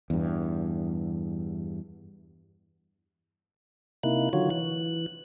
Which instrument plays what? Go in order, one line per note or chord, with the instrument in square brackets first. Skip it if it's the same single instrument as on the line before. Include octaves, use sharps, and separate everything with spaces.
[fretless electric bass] E2 G2
[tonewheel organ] C3 A#3 D#4 E4 F#6
D3 D#3 F#3 F4 F#4 C#5
E3 F#6